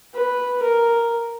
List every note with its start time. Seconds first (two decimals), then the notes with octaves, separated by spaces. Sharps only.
0.15 B4
0.63 A#4